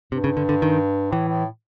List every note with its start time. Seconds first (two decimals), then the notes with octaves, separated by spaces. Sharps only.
0.12 G2 C3
0.24 C#3
0.37 D3
0.49 D3
0.62 D#3
1.11 A2 E3
1.28 A2